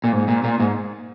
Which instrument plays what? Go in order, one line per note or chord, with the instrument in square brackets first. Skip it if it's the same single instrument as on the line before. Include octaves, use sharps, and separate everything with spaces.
[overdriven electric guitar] A#2
G#2
A#2
A#2
G#2